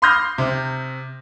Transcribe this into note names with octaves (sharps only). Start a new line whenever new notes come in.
B5 C6 D#6 F6 G6 A#6
C3